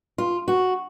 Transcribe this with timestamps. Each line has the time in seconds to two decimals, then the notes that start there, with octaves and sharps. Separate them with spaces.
0.18 F4
0.48 F#4